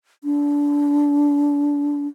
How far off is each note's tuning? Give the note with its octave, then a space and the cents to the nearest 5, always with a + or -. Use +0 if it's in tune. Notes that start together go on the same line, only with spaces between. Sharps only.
D4 -25